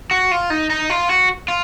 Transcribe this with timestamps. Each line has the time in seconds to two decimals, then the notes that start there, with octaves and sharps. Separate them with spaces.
0.11 F#4
0.31 F4
0.50 D#4
0.70 D#4
0.90 F4
1.09 F#4
1.48 F4